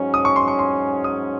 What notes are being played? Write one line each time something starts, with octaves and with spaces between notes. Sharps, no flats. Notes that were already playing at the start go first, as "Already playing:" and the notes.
Already playing: G#2 F#3 C#4
D#6
C#6
C6
C#6
C6
D#6